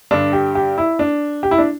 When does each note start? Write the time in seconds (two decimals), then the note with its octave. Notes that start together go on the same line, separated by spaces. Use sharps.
0.11 G2 D3 D4
0.33 G4
0.55 G4
0.78 E4
0.99 D4
1.43 G4
1.51 E4
1.58 D4